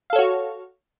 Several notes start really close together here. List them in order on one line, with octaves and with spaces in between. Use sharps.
F5 A4 C#5 F#4